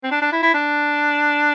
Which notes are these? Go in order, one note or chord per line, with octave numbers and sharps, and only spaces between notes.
C4
D4
D4
E4
E4
D4